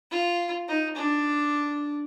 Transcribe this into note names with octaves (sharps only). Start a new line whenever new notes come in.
F4
D#4
D4